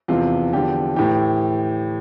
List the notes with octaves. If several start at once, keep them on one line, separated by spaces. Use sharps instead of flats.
E2 C3 F3 F4
E2 D3 F3 G4
A2 E3 G4